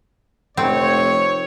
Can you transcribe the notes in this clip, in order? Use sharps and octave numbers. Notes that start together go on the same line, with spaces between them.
F1 C4 C#5